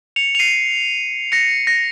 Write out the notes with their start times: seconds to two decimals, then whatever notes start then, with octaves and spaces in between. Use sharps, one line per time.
0.16 C#7 F7
0.35 F7
0.39 C7 D#7
1.32 A#6 C#7
1.67 A#6